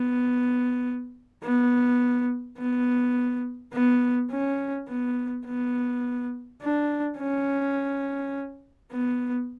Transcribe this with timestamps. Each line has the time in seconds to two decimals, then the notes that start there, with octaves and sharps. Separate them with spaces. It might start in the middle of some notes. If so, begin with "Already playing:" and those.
Already playing: B3
1.43 B3
2.58 B3
3.73 B3
4.31 C#4
4.88 B3
5.45 B3
6.62 D4
7.18 C#4
8.92 B3